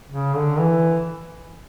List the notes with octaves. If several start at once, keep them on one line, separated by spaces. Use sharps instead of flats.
C#3
D3
E3